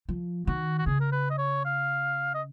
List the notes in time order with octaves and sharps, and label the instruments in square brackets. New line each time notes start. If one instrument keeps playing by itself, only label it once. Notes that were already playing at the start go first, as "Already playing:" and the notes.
[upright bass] F3
[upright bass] D#3 [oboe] F#4
[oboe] F#4
[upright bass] C#3 [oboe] G#4
[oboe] A#4
B4
D#5
C#5
F5
D#5